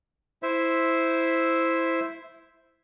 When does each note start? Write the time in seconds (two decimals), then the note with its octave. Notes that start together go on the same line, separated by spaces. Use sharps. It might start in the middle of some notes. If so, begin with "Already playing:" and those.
0.43 E4 C5 E5